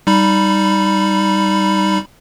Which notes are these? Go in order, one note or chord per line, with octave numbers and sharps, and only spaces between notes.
G3 D#4 B5